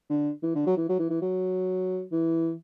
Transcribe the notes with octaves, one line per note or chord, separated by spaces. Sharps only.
D3
E3
D3
F#3
E3
F#3
E3
E3
F#3
E3